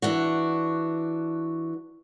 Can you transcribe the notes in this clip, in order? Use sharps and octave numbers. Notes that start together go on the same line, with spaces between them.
E3 D4 F#4